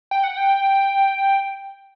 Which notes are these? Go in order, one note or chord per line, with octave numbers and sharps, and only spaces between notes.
G5
F#5
G5